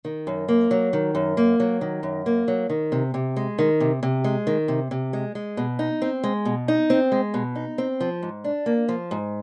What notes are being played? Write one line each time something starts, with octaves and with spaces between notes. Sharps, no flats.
D#3
F#2
A#3
F#3
D#3
F#2
A#3
F#3
D#3
F#2
A#3
F#3
D#3
C3
C3
G#3
D#3
C3
C3
G#3
D#3
C3
C3
G#3
G#3
B2
D#4
C4
G#3
B2
D#4
C4
G#3
B2
D#4
C4
F3
G#2
D4
A#3
F3
G#2